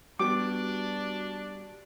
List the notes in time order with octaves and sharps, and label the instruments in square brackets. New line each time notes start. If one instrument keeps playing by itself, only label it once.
[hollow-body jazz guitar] G3 B3 [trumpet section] D4 [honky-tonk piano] F#4 [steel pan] D6